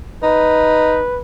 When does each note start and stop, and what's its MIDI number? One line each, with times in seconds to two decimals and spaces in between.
0.23 1.01 63
0.23 1.21 71